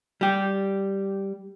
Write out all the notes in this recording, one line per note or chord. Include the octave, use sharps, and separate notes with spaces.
G3 G4